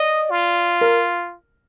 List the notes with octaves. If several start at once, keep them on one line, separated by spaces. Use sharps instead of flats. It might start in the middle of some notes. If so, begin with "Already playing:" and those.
Already playing: D5 D#5
F4
A#4